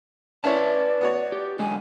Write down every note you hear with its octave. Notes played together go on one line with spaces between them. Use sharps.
C#4 E4 B4 C#5 D5 E5 A5
B3 F#4 C#5
G4
D3 F#3 G#3 G#5